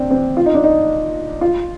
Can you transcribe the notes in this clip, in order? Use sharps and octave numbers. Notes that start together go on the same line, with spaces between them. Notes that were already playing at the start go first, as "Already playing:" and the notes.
Already playing: C4 D4
C4
F4
D#4
D4
D#4
F4